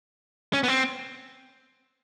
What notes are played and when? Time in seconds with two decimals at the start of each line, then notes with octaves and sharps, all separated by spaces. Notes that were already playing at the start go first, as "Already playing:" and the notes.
0.53 C#4
0.64 B3
0.68 C4